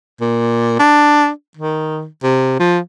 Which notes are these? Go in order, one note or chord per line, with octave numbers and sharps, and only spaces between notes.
A#2
D4
D#3
C3
F3